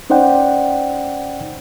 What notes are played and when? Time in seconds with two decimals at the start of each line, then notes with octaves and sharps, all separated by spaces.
0.10 C#4 D#4 C5 D5 F#5 G5